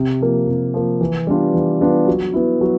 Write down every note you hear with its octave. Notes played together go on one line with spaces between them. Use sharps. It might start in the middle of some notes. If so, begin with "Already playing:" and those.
Already playing: C3
F3 A#3
C3
F3 A#3
E3
G3 B3 D4 F4
E3
G3 B3 D4 F4
F#3
B3 E4
F#3